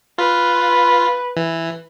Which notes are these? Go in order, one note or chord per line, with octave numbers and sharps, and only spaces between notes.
F4 B4
E3